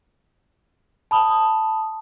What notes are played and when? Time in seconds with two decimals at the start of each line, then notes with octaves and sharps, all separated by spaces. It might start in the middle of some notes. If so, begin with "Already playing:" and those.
1.11 A5 B5 D#6